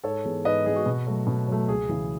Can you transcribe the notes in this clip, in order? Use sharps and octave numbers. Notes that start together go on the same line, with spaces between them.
G#2 A4 C#5
E3 G#3 B3
G#2 B4 D#5
E3 G#3 B3 G#4
F#4
B2
F#3 A3
B2
F#3 A3
C#2 G#4
C#3 E3